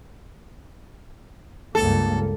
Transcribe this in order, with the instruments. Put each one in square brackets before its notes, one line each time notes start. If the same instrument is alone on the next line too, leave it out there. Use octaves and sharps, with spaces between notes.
[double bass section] C#2 G2 A#3 [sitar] A4